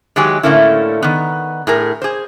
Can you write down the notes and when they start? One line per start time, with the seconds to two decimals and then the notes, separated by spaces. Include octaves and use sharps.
0.16 D#3 F#3 G#3 G4 G#5
0.43 A2 D3 A3 A#3 C#4 E4
1.03 D#3 B3
1.67 A2 G#4 A#4
2.02 G#4 C5